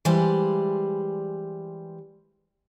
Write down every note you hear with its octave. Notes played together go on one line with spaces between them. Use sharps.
E3 G3 G#3 B4 C5 D5